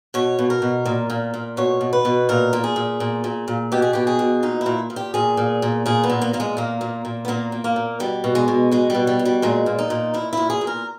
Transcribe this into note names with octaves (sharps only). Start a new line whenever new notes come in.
B2 C#5
B2
A#4
B2
A#2
A#2
A#2
B2 C#5
B2
B4
B2
A#2 A#4
A#2
G#4
A#2
A#2
A#2
A#2
B2 G4
G#4
B2 G4
G#4
B2
A#2 D#4
E4
A#2
A#2
G4
A#2 G#4
A#2
A#2
A#2 G#4
B3
A#2
A#3
A#2 A#3
G#3
A#2 A#3
A#2
A#2
B3
A#2 A#3
A#2
A#3
A#2
B2 G3
B2
G#3
B2
B2 G#3
B2 G3
G3
B2
G3
A#2 G#3
A#2
D#4
A#2
A#2 E4
A#2 E4
G#4
A#2
A#4